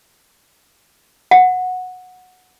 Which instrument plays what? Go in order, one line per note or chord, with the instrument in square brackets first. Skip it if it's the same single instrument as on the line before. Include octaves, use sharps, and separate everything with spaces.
[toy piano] F#5